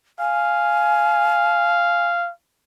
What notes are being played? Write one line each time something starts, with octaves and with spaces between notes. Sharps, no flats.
F5 G#5